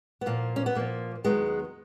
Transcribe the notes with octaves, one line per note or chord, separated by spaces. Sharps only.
B3
A#2 F3 A#3
C#4
B3
A#2 F3 A#3
D#2 D#3 F#3 G#3 B3